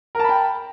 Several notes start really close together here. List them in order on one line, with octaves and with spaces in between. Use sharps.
A#4 A5 B5 G5